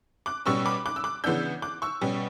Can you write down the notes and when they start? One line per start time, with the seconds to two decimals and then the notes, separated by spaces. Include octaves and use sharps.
0.26 D6 F#6
0.46 B2 G3 C#4 C#6 E6
0.66 B5 D6
0.86 D6 F#6
0.96 E6
1.04 D6 F#6
1.24 C#3 E3 B3 D4 E6 G6
1.62 D6 F#6
1.82 C#6 E6
2.01 B2 G3 C#4